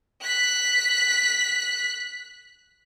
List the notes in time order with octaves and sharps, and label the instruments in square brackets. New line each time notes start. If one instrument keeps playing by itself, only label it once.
[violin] F#6 B6